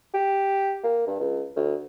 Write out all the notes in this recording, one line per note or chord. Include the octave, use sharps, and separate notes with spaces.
G4
A#3
G2
C#2
D2